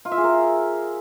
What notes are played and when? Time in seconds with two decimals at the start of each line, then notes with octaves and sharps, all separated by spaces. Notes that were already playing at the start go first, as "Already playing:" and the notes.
0.05 F4
0.11 E5
0.18 G#4
0.24 A#4